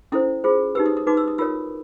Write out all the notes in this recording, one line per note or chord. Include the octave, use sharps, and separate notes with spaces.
C#4 E4 A4 C5 D#6
F4 G#4 C5
D#4 G4 B4 E6
D#6
D#6
D#4 F#4 B4 D6
E6
D#6
F4 A#4 C#5 E6